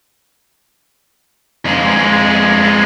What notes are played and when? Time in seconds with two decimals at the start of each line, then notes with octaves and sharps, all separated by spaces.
1.65 F2 G#3